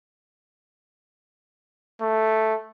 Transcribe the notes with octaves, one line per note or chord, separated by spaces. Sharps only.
A3